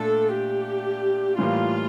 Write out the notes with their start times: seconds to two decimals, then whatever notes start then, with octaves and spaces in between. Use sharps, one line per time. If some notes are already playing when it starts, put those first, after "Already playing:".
Already playing: A#2 A3 D4 A4
0.35 G4
1.39 A2 E3 G3 A#3 F4